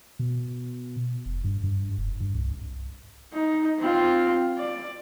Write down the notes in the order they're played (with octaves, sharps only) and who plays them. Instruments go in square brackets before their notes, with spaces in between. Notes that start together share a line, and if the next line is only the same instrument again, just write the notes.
[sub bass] B2
F1
G2
G2
F1
G2
C2
[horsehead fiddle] D#4
C4 F4
D5